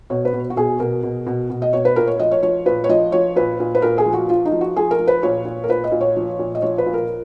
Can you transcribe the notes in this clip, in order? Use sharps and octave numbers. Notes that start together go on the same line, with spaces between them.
B2 C#5
B4
B2
F#4
B2 G#4
B2 A#4
B2
B2
B2
D#5
B2 C#5
B4
A#2 A#4
C#5
F3 D#5
C#5
F3 C#5
A#2 B4
C#5
F3 D#5
F3 C#5
A#2 B4
A#2
B4
A#2 A#4
G#4
F3
F#4
F3 F4
D#4
F3
F#4
F3 G#4
A#4
F3
B4
A#2 C#5
A#2
A#4
A#2 B4
D#5
A#2
C#5
F3
A#2
D#5
F3 C#5
B4
A#2
A#4